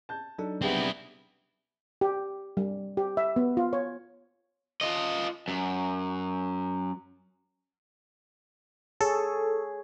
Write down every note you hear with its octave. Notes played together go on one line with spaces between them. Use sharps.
A5 G6
F#3 D4 D#4 A4
C#3 B3 C4 E4 G4
G4
G3
G4
E5
B3
F4
C#5
F4 D#5
F#2
G#4 A4 C#5